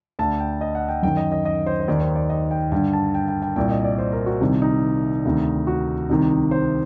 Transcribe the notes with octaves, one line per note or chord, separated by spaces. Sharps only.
D2 D3 A5
G5
D#5
F#5
G5
F#2 D#3 G5
D#5
D#5
D#5
C5
C5
D#2 D#3 D5
C5
D5
D#5
G5
G2 D3 G5
A5
G5
G5
G5
C2 A#2 G5
D#5
D5
C5
A#4
F#4
C2 C3 D#3
D#4
D2 C3 D#3
F#4
C2 C3 D#3 D#4
C5